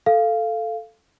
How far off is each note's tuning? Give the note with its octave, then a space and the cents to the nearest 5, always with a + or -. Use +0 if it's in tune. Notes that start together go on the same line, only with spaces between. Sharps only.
A4 +0 F5 -10